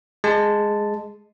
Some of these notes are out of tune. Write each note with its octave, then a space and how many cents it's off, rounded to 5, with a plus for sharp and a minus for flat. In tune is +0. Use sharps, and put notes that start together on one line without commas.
G#3 +0 A5 +0